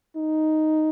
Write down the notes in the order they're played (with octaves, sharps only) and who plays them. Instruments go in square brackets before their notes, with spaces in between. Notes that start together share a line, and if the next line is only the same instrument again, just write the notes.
[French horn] D#4